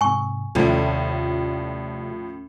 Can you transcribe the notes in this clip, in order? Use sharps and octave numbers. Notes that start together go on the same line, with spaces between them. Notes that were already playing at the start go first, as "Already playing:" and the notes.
G#2 C3 G#5 C#6
D#2 A2 C3 F3 G3 A3 C#4 E4